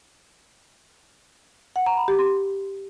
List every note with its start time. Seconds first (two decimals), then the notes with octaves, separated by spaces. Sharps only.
1.76 F#5
1.86 A#5
1.97 B5
2.08 G4
2.19 C6